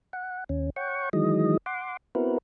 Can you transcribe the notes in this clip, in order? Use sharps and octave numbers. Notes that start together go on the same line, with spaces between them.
F#5
D#2 C#4
C#5 F#5 G5 C#6
D#3 E3 F#3 G#3 D#5
F#5 C6 D6
B3 C4 E4 F#4 A#4 B4